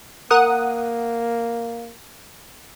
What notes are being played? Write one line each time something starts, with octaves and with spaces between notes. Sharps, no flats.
A#3 A#4 F#5 D#6